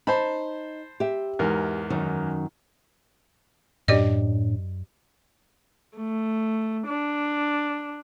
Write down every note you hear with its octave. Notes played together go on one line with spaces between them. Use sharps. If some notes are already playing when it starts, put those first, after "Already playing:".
D#4 C5 A5 B5
G4 E5
E2 G#2 A#4
F#2 D#3
F#2 A2 D4 G4 D5 D#5
A3
D4